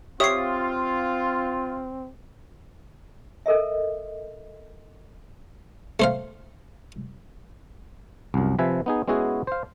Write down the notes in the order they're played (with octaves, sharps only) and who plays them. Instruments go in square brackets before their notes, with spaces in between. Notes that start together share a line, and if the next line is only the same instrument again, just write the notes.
[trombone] C4 [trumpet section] F4 [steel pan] G4 C#5 E5 [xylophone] D#6 C7
[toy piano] A4 A#4 D#5 E5
[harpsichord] A3 C5 F5
[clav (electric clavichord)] C2 F#2
C3 F3 B4 E5 G#5
B3 D#4 G#4
G#3 B3 C#4 E4 F#4 G#4
C5 F5